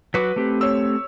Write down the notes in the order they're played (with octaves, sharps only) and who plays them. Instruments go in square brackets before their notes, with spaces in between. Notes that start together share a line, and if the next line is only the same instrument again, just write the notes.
[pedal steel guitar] F#3 F#4 D6 [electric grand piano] B4 B6
[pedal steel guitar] A3 C4 G4
[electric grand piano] C#5 E6